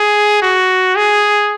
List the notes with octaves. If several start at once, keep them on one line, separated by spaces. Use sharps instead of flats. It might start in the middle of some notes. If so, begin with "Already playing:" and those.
Already playing: G#4
F#4
G#4